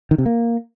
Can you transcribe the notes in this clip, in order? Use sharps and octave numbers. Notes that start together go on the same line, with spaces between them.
D#3
C3
A#3